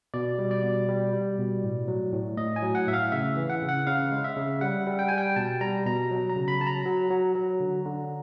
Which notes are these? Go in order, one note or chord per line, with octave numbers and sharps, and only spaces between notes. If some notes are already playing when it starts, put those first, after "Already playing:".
B2 D5
G3
D5
B2
G3
G3
B2
A2
F#3
A2
A2 D#5
G#5
F#3
F#5
A2 E5
F5
C#3 E5
E3
F#5
C#3
F#5
C#3 F5
G#3
E5
C#3
G3 F#5
G3
G5
G3 G#5
G5
B2 A5
G3 A#5
B2 A#5
F#3
A#5
C#3
B5
F#3 A5
A#5
F#3
F#3
F#3
D3
D3